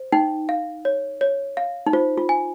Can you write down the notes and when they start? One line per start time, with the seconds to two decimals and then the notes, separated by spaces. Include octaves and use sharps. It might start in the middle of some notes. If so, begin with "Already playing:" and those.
Already playing: C5
0.12 D#4 G5
0.49 F5
0.85 C#5
1.21 C#5
1.57 F5
1.86 D#4
1.93 F4 C5
2.18 F4
2.29 G#5